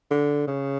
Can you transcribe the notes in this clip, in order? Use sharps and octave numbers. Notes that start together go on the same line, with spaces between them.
D3
C#3